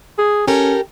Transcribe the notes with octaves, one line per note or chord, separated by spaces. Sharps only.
G#4
C#4 G4 A4 A#4